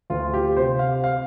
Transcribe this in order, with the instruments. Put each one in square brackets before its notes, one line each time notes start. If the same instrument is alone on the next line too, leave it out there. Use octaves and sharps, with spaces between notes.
[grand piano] D2 F4
G4
C3 C5
F5
F5